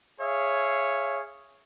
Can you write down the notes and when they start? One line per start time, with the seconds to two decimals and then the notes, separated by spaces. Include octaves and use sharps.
0.21 G#4 C#5 E5 F5